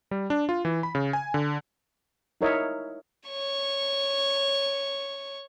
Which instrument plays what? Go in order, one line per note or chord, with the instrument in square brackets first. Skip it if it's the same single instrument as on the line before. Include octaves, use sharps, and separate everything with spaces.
[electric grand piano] G3
D4
F4
E3
B5
C#3
G#5
D3
[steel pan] D#4 E4 A#4 C#5 D#5 E5
[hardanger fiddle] C#5 C#6